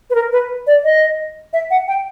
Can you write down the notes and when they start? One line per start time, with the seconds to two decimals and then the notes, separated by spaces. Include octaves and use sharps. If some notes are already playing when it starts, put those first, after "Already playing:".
0.10 B4
0.15 A#4
0.32 B4
0.67 D5
0.84 D#5
1.53 E5
1.71 F#5
1.88 G5